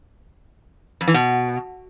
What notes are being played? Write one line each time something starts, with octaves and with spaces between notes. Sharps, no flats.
F2
E3
B2